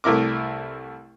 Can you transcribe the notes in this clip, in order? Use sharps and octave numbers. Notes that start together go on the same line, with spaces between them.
C2 A3 E4 A#4 D6